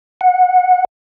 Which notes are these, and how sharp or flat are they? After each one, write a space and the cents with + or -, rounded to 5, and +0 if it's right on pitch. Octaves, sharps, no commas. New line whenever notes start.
F#5 -20